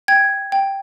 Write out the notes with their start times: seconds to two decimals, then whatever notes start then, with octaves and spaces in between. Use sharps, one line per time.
0.08 G5 G#6
0.52 G5